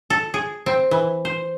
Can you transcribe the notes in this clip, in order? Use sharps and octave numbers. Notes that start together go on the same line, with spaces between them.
A4
G#4
C4
E3
C5